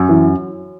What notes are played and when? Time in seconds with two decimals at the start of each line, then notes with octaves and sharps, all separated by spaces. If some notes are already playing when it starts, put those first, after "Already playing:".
Already playing: F#2
0.09 E3